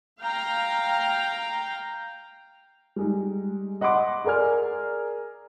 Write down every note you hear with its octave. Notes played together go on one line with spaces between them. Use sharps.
F5 G5 A#5
G3 G#3 D#4
D#5 F#5 B5 C6 D6
G#4 A#4 D5 G#5 F6